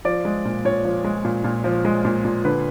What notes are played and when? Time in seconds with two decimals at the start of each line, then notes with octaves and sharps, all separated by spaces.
0.05 F3 D5
0.25 G#3
0.45 A#2
0.65 A#2 C#5
0.85 F3
1.04 G#3
1.25 A#2
1.44 A#2
1.64 F3
1.85 G#3
2.05 A#2
2.25 A#2
2.45 D3 B4